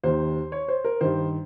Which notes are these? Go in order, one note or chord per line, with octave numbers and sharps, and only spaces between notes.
D#2 D#3 C5
C#5
C5
A#4
G2 D#3 C5